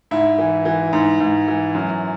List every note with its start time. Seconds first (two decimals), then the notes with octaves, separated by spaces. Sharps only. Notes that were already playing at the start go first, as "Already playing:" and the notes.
0.11 G#2 E4
0.38 E3
0.65 E3
0.93 G#2
1.20 G#2
1.48 E3
1.75 F#2